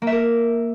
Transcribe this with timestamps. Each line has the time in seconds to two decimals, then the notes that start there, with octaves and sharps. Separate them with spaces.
0.02 A#3
0.07 E5
0.12 A#4